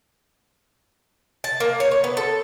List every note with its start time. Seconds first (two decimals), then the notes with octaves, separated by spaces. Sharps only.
1.44 A5
1.60 A#3
1.80 C#5
1.91 C#5
2.04 B3
2.17 A4